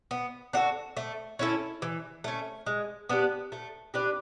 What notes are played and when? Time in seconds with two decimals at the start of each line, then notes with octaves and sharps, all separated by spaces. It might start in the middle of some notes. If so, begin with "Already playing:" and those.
0.11 B3
0.53 D4 F#4 A4
0.97 A3
1.39 C#4 E4 A4
1.82 E3
2.24 A3 C#4
2.66 G#3
3.09 B3 D4 G4
3.52 A3
3.94 D4 G4 B4